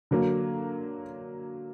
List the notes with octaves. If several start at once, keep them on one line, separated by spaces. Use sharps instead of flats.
D3 F#3 A#3